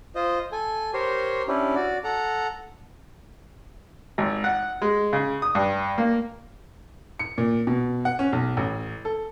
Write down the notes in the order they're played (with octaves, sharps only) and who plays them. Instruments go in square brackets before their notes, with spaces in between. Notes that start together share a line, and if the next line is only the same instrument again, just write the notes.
[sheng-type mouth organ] F4 C5 D#5
A4 G#5
G4 A#4 C5 C#5 C6
C#4 D4 E4 G4
F#4 D5
A4 F#5 A#5
[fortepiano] G#1
F#5
G#3
C#3
D#6
G2
A#3
[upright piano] C#7
A#2
B2
F#5
C#4
B1
A1
A4